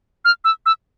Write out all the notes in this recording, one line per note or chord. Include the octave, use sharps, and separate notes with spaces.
F6
E6
E6